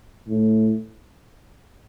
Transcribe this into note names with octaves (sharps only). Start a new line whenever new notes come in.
A2